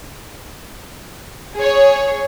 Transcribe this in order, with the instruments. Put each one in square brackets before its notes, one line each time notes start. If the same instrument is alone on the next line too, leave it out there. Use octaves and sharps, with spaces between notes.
[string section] G#4 C#5